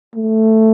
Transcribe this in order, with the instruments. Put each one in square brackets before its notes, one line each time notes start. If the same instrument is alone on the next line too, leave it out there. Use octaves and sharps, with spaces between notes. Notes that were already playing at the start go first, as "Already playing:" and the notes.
[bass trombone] A3